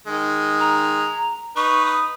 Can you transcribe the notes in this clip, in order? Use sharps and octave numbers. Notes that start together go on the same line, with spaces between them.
D#3 G#3
A#5
D#4 B4 C#6
D#6